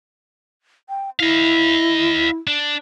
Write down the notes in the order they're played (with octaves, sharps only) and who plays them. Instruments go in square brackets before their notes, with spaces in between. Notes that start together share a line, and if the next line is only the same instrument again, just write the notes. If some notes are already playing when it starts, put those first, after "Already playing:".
[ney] G5
[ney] E4 [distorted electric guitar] D#5 F5
[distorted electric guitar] D4